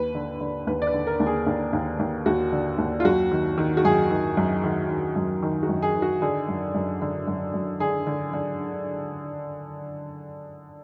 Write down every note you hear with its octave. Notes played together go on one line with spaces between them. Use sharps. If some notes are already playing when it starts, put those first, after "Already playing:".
Already playing: D#2 B4
D3
D3
D#2 B4
D5
B4
D3
A#4
D#2
G#4
D#2
D#2
D#2
D#2 F#4
D3
D#2
F4
F#2 F#4
D#3
D#3
F#4
F#2 G#4
D#3
F#2
D#3
D#3
F#2
D#3
F#4
F#2
G#4
D#3
F#4
D3 G#4
F#2
F#2
D3
F#2
F#2
D3 G#4
D3
D3